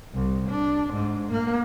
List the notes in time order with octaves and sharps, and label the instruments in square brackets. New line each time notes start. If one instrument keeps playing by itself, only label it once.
[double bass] C2
D4
G#2
A#3